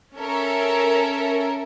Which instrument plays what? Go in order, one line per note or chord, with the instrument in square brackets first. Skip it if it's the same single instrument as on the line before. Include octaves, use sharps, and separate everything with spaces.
[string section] C#4 A4 A#4 E5